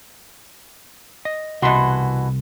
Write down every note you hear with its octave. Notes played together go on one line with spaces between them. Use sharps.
D#5
C2 B2 E3 F#4 C6